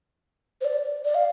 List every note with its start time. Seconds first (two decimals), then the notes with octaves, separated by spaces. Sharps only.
0.61 C5
0.65 D5
1.05 D5
1.15 F5